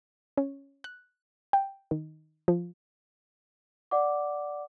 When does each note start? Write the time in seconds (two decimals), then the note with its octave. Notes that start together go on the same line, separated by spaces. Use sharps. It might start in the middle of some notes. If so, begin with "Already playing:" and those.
0.37 C#4
0.84 F#6
1.53 G5
1.91 D#3
2.48 F3
3.91 D5 F#5 D6